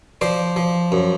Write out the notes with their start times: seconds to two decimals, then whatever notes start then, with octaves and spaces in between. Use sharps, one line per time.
0.21 F3 C5 D5
0.56 F3
0.92 F#2